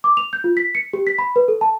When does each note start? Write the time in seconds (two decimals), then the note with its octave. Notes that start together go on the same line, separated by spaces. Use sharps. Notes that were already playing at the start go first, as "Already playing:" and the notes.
0.04 D6
0.17 F7
0.33 G6
0.44 F4
0.57 B6
0.75 C#7
0.93 G4
1.07 B6
1.19 B5
1.36 B4
1.48 A4
1.61 A5